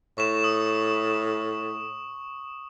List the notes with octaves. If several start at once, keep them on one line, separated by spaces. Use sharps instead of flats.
A2 C#6 E7
D#6